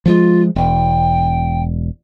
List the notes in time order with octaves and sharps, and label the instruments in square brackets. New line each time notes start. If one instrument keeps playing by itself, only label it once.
[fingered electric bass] F3 G3 G#3 [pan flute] F4
[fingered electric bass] E1 [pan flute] G5